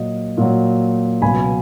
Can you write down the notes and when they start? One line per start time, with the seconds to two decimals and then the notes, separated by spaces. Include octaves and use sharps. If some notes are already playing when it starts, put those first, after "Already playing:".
Already playing: A#2 F#3 D#5
0.37 A#2 F#3
1.22 C#2 B2 F#3 G#5 B5